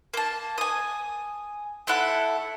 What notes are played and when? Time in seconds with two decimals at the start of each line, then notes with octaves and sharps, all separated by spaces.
0.14 A#3 A5
0.58 G#5 D#6
1.87 A3 E4 A4 F#5